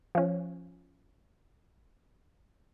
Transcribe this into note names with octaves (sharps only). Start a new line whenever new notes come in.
F3 C#4